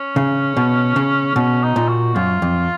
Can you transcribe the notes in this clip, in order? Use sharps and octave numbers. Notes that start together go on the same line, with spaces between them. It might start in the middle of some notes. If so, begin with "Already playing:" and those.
Already playing: C#4
C#3
B2
C#3
B2 C#4
D#4
A#2
F#4
F#2 F4
F2